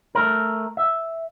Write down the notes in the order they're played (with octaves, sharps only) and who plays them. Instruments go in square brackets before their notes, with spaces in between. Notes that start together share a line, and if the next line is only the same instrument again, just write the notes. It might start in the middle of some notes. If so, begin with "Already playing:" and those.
[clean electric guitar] A3 A#4
E5